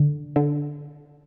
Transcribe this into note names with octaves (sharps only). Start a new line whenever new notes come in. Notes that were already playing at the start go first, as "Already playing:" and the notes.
Already playing: D3
D3